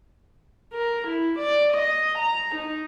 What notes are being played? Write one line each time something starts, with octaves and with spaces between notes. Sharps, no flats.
A#4
E4
D5
D#5
A#5
D#4